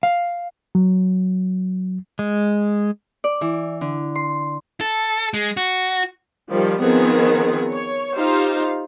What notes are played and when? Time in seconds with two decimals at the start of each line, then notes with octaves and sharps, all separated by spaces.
0.03 F5
0.75 F#3
2.19 G#3
3.24 D5
3.41 E3
3.81 D3
4.16 C6
4.81 A4
5.34 G#3
5.57 F#4
6.51 D#3 F3 G3
6.82 D#3 F3 B3 C4 G#4
7.70 C#5
8.18 D#4 F4 G4 C5 F5